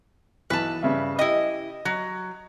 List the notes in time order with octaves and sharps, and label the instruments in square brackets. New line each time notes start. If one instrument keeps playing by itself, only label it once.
[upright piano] B1 E3 [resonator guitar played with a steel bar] B4 A5
[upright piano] G2 C#3 E5
[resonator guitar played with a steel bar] E4 D#5 [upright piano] G4
[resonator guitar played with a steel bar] F#3 [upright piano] A#6